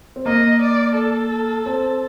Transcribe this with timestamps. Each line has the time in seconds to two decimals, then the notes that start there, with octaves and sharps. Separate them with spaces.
0.16 C4
0.26 A#3 D#5
0.61 D5
0.96 A4
1.66 C4